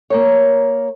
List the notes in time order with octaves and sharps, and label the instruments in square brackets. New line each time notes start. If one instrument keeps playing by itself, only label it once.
[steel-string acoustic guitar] A#3 A#4 C#5